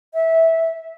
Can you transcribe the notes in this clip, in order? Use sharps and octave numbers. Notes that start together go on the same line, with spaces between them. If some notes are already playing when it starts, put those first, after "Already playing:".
E5